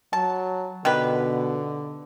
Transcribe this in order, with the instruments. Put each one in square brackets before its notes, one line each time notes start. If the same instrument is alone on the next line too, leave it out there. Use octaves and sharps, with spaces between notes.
[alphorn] F#3 [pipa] A5
[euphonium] B2 [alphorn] D3 [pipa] D#3 G4 B4